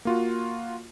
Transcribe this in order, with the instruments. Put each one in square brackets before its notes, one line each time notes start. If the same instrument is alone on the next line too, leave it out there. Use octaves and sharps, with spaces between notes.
[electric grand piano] A#3 F4 F#4